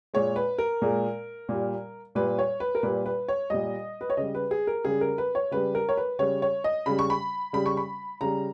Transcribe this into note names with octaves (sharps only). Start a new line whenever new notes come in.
A#2 G#3 C#5
B4
A#4
A#2 G#3
A#2 G3
A#2 G3 B4
C#5
B4
A#4
A#2 G3 B4
B4
C#5
A#2 G3 D#5
B4
C#5
C#3 G3 D#5
B4
G#4
A#4
C#3 G3 G#4
A#4
B4
C#5
C#3 G3 B4
A#4
C#5
B4
C#3 G3 C#5
C#5
D#5
C#3 G3 B5
C#6
B5
C#3 G3 B5
C#6
B5
C#3 G3 A#5